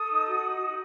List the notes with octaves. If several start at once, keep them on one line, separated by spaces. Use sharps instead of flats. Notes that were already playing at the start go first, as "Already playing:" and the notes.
Already playing: A4 D#6
D#4
F#4
D#4
F#4